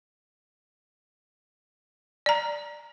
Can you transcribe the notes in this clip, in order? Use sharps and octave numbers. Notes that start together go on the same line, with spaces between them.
D5 A#5